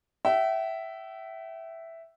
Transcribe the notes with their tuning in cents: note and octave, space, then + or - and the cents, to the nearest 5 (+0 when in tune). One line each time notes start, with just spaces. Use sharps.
E5 +0 G5 -40